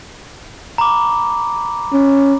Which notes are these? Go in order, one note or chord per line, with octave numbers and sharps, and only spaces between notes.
A#5 B5 D6
C#4